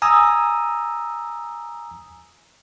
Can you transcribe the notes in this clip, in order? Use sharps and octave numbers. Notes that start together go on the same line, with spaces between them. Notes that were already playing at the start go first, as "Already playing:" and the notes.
G#5 A#5 D#6 E6